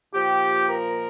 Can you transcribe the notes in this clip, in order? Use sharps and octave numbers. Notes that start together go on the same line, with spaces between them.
A#2 F3 G4
A#4